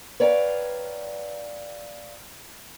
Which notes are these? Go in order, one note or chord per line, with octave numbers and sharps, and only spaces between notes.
B4 C#5 D5 F5 G5 A#5